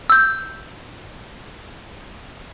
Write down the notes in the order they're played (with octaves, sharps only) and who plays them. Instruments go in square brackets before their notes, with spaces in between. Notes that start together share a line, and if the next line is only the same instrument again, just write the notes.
[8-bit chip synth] E6 G6